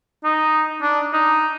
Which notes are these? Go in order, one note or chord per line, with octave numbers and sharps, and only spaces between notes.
D#4
D4
D#4